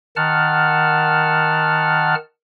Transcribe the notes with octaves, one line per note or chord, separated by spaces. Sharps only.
D#3 F#5 A5 F6